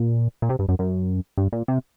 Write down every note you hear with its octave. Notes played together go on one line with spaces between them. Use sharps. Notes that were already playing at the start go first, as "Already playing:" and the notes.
Already playing: A#2
A#2
C3
G2
F#2
F#2
G2
A#2
C3